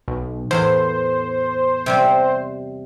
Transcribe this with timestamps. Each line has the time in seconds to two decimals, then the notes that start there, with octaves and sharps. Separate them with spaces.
0.08 B1
0.51 E2 A2 C5 C6
1.86 C3 G3 C4